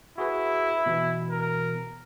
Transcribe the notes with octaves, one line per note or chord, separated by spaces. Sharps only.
E4 F#4 G#4 B4
B2 E3
A#4